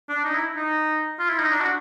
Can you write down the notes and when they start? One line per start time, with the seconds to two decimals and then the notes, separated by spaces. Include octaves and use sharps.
0.09 D4
0.24 D#4
0.35 E4
0.56 D#4
1.19 F4
1.29 E4
1.39 D#4
1.51 D4
1.61 F#4